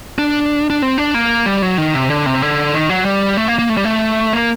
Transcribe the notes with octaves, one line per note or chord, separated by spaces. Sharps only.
D4
D4
C4
D4
A#3
G3
F#3
D#3
C3
D3
C3
D3
D#3
F#3
G3
A3
A#3
A#3
A3
G3
A3
A#3